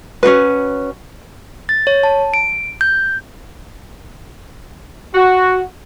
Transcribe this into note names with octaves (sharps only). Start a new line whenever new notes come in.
C#4 D4 F#4 B4
A6
C#5
A5
D7
G6
F#4